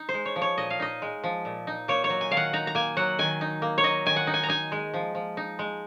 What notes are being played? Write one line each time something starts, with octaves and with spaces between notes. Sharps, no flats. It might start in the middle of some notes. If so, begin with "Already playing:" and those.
Already playing: D#4
C5
G#3
C#5
F3
C#5
A#2 D#5
F5
D#4 D#5
G#3
F3
A#2
D#4
A#3 C#5
C#5
F#3
G#5
D#3 F5
F#5
D#4 A#5
A#5
A#3 G#5
F#3 F#5
D#3 G#5
D#4
A#3
C#5
F#3 D#5
D#3 G#5
F#5
D#4
G#5
A#5
D#4 G#5
G#3
F3
F3
D#4
G#3